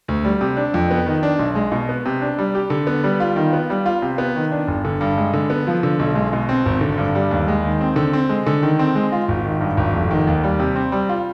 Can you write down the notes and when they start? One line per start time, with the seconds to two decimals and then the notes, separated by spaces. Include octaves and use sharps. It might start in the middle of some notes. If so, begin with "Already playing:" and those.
0.08 D2
0.25 G3
0.41 C3
0.57 D4
0.74 F2
0.91 B3
1.06 D#3
1.23 D4
1.39 B1
1.55 G#3
1.72 B2
1.89 B3
2.05 C3
2.22 D4
2.38 G3
2.55 G4
2.70 D3
2.87 B3
3.04 G3
3.20 F4
3.36 D#3
3.53 B3
3.70 G3
3.86 F4
4.02 C3
4.18 B3
4.36 D#3
4.51 D4
4.68 G1
4.85 D3
5.01 G2
5.18 G#3
5.34 D3
5.50 B3
5.67 F3
5.83 D3
5.99 B1
6.15 G#3
6.33 B2
6.49 C4
6.66 G#1
6.81 D3
6.98 G2
7.15 G3
7.31 D#2
7.48 G#3
7.64 D#3
7.81 C4
7.96 D3
8.13 C4
8.29 G#3
8.47 D3
8.63 D#3
8.79 C4
8.95 G#3
9.12 F4
9.28 G#1
9.45 D#3
9.61 G2
9.77 G#1
9.93 F1
10.11 D#3
10.27 D#2
10.44 G3
10.59 C3
10.76 C4
10.92 G3
11.09 F4